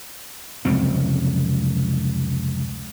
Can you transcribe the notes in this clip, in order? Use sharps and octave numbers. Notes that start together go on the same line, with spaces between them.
F1 C#2 F#3 C4